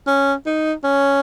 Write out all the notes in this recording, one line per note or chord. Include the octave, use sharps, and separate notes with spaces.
C#4
D#4
C#4